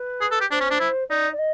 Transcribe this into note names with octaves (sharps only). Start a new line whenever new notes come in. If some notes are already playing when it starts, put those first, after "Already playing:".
Already playing: B4
G#4
A4
G4
D4 C5
C#4
D4
E4
D#4 D5
D5
D#5